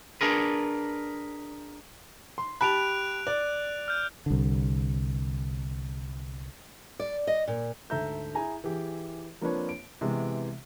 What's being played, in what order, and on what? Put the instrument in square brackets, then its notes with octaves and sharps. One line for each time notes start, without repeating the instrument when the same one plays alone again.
[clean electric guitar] D4 G#4 A#4 B4
[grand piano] C6
[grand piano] G4 A5 B5 [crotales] F#6 D7 F7
[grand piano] D5 [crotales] F#6
[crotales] F6 G6
[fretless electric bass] C2 D3
[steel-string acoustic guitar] D5
D#5
A#2
[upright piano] D2 G#2 A4 E5 A#5 G6
E4 G#4 G#5 A#5
E3 G4 G#4
F3 A#3 C4 D4 B4 C#5
D7
C3 E3 G#3 B3